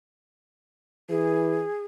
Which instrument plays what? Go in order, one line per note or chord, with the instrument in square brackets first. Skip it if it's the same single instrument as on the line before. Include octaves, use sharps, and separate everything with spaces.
[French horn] E3 [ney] G#4